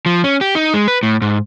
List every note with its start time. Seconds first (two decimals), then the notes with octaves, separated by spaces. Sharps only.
0.06 F3
0.24 C#4
0.41 G4
0.55 D#4
0.74 G#3
0.88 B4
1.03 A2
1.22 G#2